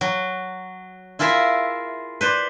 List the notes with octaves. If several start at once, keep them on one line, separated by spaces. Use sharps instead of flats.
F#3
E4 F4 G#4 A#4 E5
B4 C5 D5